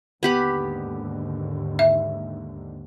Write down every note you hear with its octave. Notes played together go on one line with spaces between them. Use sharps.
D#2 G#2 D3 B3 G4 B5
E5